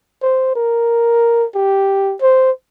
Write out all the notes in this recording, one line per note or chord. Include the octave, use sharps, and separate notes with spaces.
C5
A#4
G4
C5